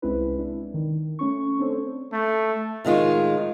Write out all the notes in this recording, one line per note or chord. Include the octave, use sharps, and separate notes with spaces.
C2 G#3 C4 C#4 E4 B4
D4 E4
D#3
A3 C#4 C#6
C4 D4 A4 C5 C#5
A3
A2 D#3 G#3 F4